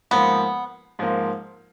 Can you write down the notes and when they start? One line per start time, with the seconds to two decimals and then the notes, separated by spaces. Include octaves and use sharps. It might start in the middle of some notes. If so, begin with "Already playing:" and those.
0.11 G#2 F3 A#3 B3
0.99 G#2 F3 A#3